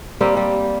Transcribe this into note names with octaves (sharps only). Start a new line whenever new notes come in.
G3 A#3 C4
G3